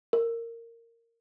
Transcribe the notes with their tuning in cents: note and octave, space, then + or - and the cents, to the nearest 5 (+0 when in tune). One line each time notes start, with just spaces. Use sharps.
A#4 -15